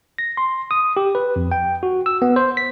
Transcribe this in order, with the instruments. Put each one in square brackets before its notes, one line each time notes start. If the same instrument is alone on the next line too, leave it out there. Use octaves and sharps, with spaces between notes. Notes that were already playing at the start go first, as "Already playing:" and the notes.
[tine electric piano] A#6
C6
D#6
G4
B4
F2
G5
F#4
E6
B3
C5
B6